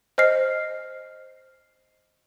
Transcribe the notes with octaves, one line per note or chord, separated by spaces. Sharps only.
C5 D#5 F6 C7